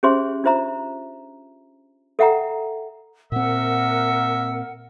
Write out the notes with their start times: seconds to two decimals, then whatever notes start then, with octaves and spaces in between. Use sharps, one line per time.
0.03 C#4 G4 G#4 C5 E5 C6
0.44 D4 F4 C5 E5 A#5
2.19 A4 E5 F#5 G5 A#5
3.32 A#2 C4 A#4 E5 F#5